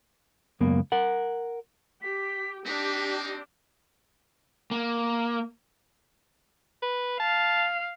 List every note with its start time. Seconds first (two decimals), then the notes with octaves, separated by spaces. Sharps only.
0.61 C#2 F#2 A#3 B3
0.92 A#4 F#5
2.02 G4 B6
2.66 C4 D4 D#4 G4 B6
4.71 A#3
6.82 B4
7.20 F5 A5